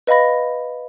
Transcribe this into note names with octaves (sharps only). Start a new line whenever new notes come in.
B4 D#5 F5 B5 A#6